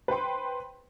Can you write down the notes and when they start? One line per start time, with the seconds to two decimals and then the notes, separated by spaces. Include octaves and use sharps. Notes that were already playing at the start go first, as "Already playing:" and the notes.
0.08 B4 C5 G5 C6